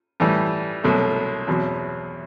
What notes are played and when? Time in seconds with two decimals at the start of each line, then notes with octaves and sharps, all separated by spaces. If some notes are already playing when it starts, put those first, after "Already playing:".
0.20 A2 E3 G3
0.83 C2 B2 F#3 A3
1.48 E2 B2 F#3 C4